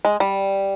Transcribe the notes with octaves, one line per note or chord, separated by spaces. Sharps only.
G#3
G3